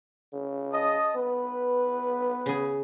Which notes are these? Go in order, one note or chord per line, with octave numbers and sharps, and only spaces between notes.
C#3
D#5 A5 D#6
B3 B4
C#3 G#4